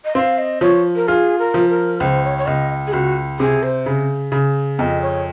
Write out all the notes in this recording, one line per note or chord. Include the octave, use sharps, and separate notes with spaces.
D#5
C4 F5
D#5
F3 C#5
A#4
F4 G#4
A#4
F3
A#4
C#2 C5
C#5
C#5
C#2 D#5
G#4
C#2 F#4
C3 G#4
C5
C#3
C#3
F2 D#5
C#5